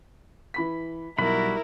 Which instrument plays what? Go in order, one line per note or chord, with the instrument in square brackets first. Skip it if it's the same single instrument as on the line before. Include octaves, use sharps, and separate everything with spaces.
[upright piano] E3 B5 B6
[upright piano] B1 [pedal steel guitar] G3 F#4 B5 [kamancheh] E4 A#4